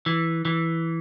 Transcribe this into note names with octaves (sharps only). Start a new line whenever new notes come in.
E3
E3